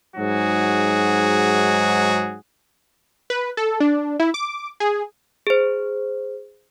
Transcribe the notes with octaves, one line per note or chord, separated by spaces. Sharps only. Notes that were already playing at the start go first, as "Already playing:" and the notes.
G#2 F#3 D#4 F#4 G#4
B4
A4
D4
E4
D6
G#4
G#4 C5